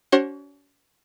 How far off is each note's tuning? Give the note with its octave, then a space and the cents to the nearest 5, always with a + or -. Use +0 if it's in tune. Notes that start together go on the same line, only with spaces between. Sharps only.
C#4 +40 F#4 +35 C5 +45